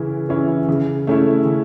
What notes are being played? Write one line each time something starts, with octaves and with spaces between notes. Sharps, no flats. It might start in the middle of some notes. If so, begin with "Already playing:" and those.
Already playing: C#3 E3 C#4 E4
E3 C#4 E4
C#3
A3 C#4 E4
C#3